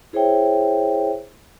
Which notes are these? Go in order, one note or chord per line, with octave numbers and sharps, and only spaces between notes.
E4 G#4 C5 C#5 E5 G5